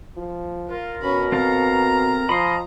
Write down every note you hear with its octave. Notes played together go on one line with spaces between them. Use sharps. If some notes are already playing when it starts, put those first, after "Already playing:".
F3
F4 A#4
B2 C#4 B5
C4 A4 F5 A#5
F3 D#5 B5 C6